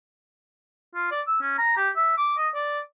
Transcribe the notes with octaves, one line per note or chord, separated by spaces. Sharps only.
F4
D5
E6
C#4
A#5
G4
E5
D6
D#5
D5